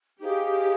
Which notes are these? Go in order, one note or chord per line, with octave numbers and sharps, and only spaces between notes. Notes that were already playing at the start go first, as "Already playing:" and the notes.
D#4 G4 G#4 C5 F5